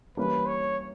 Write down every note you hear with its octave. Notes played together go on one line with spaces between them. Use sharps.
E3 G3 A#3 C#4 B4
C#5